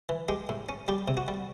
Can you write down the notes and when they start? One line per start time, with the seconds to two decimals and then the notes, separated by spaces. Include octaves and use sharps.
0.09 E3
0.29 G#3 G4
0.49 A2
0.69 C#4
0.88 G3 G4
1.08 C3
1.17 F#4
1.28 G3